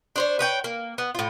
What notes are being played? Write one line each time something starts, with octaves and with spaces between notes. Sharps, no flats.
D4 C5 C#5
B4 C#5 G5
A#3
B3
A2 F4